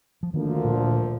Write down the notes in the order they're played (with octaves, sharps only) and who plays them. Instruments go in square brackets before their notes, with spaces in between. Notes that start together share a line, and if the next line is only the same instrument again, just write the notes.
[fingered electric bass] F3
[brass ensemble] D2 D3 F3 A#3 [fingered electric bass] D#3
[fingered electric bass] A#2